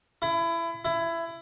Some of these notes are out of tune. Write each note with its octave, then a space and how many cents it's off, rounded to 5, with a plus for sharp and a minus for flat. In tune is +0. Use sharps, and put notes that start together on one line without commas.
E4 +25
E4 +20